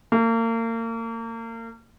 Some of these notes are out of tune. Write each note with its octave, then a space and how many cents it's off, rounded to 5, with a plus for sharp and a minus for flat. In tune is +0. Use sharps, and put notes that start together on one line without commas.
A#3 -35